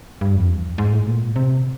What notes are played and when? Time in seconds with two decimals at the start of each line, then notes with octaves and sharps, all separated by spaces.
0.21 G2
0.36 F2
0.50 E2
0.78 G#2
0.93 A2
1.06 A#2
1.36 C3